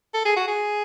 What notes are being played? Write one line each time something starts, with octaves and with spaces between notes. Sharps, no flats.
A4
G#4
F#4
G#4